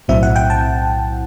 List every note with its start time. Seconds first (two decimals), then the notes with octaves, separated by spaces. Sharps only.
0.08 B1 A2 F#3 C4 E4 E5
0.23 F#5
0.36 G5
0.50 A5